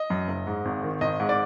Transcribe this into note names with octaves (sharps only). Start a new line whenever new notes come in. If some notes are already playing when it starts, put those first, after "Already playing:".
Already playing: D#5
F#2
F#1
G#2
G#1
D#3
G#1 D#5
G#2
D5